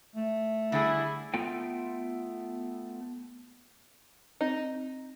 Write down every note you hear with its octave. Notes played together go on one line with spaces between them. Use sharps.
A3
D3 G3 E4 G#4
A3 B3 F4 A4 G5
C4 D#4